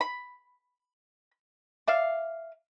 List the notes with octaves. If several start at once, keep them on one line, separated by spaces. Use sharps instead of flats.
B5
D5 E5 F5